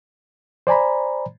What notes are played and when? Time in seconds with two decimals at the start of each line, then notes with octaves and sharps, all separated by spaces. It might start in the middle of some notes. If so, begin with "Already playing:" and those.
0.67 C5 D5 G#5 A#5 B5